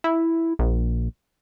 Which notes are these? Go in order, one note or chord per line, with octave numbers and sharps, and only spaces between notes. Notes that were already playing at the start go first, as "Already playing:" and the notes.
E4
A#1